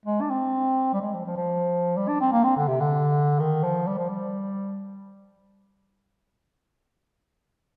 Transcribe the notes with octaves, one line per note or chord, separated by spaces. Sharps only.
G#3
D4
C4
G3
G#3
F3
F3
F3
G3
D4
C4
A#3
C4
D3
C3
D3
D#3
F3
G3
F3
G3